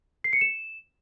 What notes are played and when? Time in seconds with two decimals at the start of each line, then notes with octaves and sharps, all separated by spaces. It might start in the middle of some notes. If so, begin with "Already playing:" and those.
0.24 C7
0.33 C#7
0.41 E7